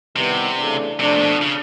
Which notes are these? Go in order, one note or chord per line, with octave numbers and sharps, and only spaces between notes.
C3 D#3 G3 B3 E4
C#3 E3 A3 D4
C3 F3 A3 D4
A#2
B2
C#3